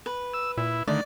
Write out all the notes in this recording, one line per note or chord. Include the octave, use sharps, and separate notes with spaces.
B4
E6
A#2 E4
D3 D#3 A3 D5